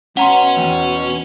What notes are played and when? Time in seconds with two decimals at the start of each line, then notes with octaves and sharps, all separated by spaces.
0.17 B2 C#4 F#5 A#5 C6
0.57 E2 G5